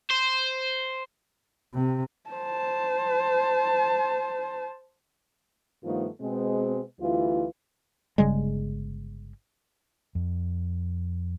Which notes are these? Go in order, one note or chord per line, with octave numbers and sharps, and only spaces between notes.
C5
C3
C5 A5
G2 D#3 F3 A3 B3 F4
B2 G#3 C4
D2 E3 G3 E4 F4
G1 C#3 G3 G#3
F2